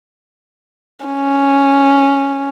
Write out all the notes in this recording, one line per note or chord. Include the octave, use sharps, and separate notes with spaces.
C#4